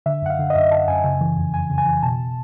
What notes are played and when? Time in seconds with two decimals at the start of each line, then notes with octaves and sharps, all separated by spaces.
0.06 D3 E5
0.22 F#2 F#5
0.30 F5
0.39 D3
0.50 D#5
0.55 F#2 E5
0.71 D3 A5
0.88 F#2 G#5
1.04 C#3
1.21 E3
1.37 F2
1.53 F2 G#5
1.70 C#3
1.78 G#5
1.86 E3
2.03 B2 A5